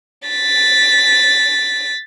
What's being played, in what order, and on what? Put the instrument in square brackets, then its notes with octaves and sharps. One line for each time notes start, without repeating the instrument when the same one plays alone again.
[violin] A6 B6